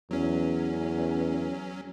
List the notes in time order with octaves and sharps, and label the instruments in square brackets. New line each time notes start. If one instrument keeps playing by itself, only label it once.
[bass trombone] E2 [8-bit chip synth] F#3 C#4